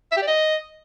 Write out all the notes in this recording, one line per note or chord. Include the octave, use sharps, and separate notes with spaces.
E5
G4
D5
D#5